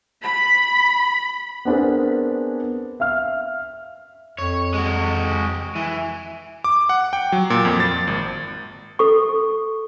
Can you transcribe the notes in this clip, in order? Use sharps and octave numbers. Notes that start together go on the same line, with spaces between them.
B5
B3 C4 D4 G#4 A#4
E5 F5 F6
F2 C#5
G#3 F#4
E3
D6
F#5
G5
F#3
A#2
F2
A6
G#1
A4 C#6